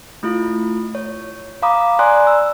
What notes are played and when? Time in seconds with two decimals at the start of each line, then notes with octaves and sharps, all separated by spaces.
0.23 A3 E4 F4
0.95 C#5
1.62 F5 A#5 B5 D6 D#6
1.99 D5 G#5 A#5 C6 D#6 F#6
2.27 E6